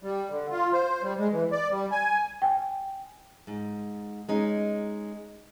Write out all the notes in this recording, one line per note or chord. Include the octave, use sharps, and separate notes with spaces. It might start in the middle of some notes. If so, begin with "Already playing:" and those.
G3
D3
F4
C5
G3
G#3
E3
D5
G3
G#5
G5 G#5
G#2
G#3 C#4 D#4